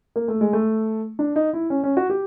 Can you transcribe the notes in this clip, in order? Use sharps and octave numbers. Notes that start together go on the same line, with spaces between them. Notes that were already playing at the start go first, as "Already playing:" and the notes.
A#3
A3
G#3
A3
D4
D#4
E4
C#4
C#4
F#4
G4